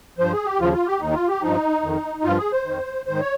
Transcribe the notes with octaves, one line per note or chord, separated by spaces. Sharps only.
G2 F3 C5
G#4
G4
D#2 C#3 F3 F4
F4
G4
D#2 D#3 D#4
F4
G4
G2 F3 D#4
F2 D#3
G2 F3 F4
G#4
C5
F2 D#3
G#2 D#3 C5
C#5